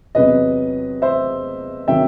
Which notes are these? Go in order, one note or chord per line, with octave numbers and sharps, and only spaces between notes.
E2 C3 F#3 B4 D#5
C5 E5
C3 D#3 F#3 E5 G5